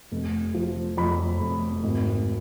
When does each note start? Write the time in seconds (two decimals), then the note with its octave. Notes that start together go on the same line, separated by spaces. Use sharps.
0.12 F1
0.54 F3
0.97 F2 B5
1.41 F1
1.84 G#1